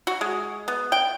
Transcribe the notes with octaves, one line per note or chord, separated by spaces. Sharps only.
F#4
G#3
B3
G5